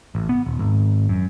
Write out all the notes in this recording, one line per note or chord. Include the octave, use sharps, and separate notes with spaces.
A1
B3
D#1
G#1
F#2